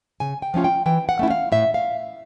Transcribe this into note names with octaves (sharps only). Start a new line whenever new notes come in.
C#3 G#5
G5
F3 A3 C#4 F4
G5
E3 G5
F#5
A3 C#4 E4
F5
A2 E5
F5